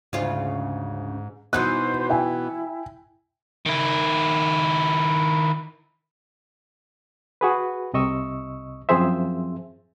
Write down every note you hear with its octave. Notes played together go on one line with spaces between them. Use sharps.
D2 G#2 C#3 F4
B2 E3 B3 D#4 C5 F#6
E4 E5 G5 G#5
D#3 E4
F#4 G#4 B4
C2 C3 D#5 C#6 E6
F#2 F3 C4 G#4 C5 E5